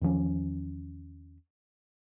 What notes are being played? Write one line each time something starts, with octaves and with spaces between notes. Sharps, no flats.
E2 D#3 F3 C#4